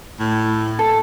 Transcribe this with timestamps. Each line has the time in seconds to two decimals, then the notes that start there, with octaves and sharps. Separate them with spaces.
0.19 A2
0.79 A4